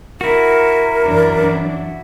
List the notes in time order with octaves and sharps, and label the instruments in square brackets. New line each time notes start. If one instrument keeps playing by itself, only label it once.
[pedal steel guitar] E4 F#4 [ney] A#4
[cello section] F#2 E3 D4